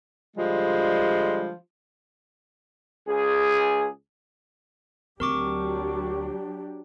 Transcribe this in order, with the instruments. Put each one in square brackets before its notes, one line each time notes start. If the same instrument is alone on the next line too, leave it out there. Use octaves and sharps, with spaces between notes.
[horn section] D3 F3 G3 G#3
[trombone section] C#2 G#4
[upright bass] D2 C4 [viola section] F#3 D4 G4 [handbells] A#4 C#6 D6